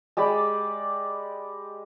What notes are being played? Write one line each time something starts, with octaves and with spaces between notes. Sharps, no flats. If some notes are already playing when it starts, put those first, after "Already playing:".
G#3 G4 D5 B5